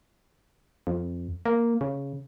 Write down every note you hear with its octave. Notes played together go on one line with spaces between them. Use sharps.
F2
A#3
C#3